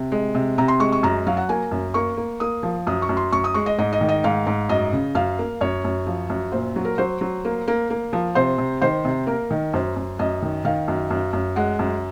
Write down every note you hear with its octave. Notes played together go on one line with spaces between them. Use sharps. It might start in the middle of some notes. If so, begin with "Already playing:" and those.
Already playing: C3
G#3
C3
C3 A#5
C6
G#3 C#6
C#6
F#2 A#5
F#3 F5
F#5
A#3 G#5
F#2
A#3 C#6
A#3
A#3 D#6
F3
F#2 D#6
C#6
F#2
C6
F#2 C#6
D#6
G#3 C#6
D#5
G#2 D#5
D#5
D#3
D#5
G#2 F5
G#2
F#2 D#5
C#3
F#2 F5
A#3
F#2 C#5
F#2
F3
F#2
A#2 C5
F#3
A#4
F#3 C5
F#3
A#3
A#3
A#3
F3
C3 C5
C3
D#3 C5
C3
A#3 A#4
D#3
F#2 C5
F#2
F#2 D#5
D#3
D#3 F5
F#2
F#2
F#2
G#3 F#5
F#2